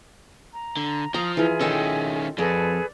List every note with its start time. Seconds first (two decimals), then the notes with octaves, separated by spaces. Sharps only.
0.53 A#5
0.77 D3
1.14 F3 F5 A#5 D#6
1.37 E3 F4 G#4 E5
1.61 D#3 C#4 A4 D#5 G5
2.38 F2 G#4 A4 B4 D5